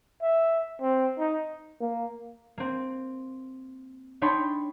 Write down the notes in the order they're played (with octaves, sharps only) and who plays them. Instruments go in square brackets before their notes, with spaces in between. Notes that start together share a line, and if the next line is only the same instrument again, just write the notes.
[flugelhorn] E5
C4
D#4
[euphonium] A#3
[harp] A#3 C4
D4 D#4 C#5 G5 B5 C6